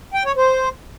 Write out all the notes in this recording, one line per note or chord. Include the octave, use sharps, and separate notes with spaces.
G5
C#5
C5